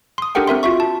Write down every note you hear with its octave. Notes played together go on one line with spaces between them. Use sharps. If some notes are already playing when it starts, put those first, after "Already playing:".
C6 D#6
D4 G4 A4 A#4 F#5 G5
C4 A#4 E5 C6
F4 F#4 E5 C#6
A5